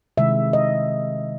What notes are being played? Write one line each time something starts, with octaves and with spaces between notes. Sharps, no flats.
C3 D#3 G#3 E5
D#5